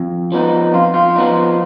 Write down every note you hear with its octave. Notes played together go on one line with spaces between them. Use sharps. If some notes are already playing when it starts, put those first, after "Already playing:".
Already playing: F2
F3 B3 D#4
F2 F4
F4
F3 B3 D#4